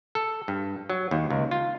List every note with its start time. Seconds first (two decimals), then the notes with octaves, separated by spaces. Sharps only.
0.15 A4
0.48 G2
0.90 F#3
1.11 D#2
1.30 C#2
1.51 F4